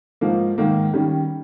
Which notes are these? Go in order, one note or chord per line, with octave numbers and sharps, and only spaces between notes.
G#2 F3 A#3
G#2 D#3 A#3
D#3 G3 C#4